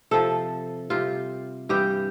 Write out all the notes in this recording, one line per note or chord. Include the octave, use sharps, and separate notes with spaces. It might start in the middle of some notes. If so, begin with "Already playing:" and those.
C3 F3 A4
C3 G3 F4
G2 E3 G3 G4